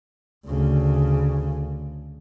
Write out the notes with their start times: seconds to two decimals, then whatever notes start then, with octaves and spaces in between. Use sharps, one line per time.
0.47 D2 C#3